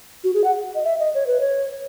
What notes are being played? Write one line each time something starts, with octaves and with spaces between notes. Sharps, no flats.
F#4
G#4
F#5
D#5
E5
D#5
C#5
B4
C#5